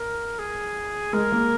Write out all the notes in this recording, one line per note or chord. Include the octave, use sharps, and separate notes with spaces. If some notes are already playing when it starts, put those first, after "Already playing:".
Already playing: A#4
G#4
G#3 A#4
A#3